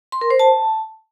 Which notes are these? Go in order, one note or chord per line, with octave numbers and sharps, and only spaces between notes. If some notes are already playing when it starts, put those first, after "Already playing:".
C6
A#4
C5
A5